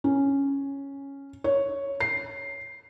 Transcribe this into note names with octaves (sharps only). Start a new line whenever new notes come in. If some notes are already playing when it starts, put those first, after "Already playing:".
C#4
C#5
C7